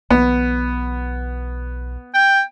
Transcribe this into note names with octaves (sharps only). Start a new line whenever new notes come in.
B1 E3 B3
G5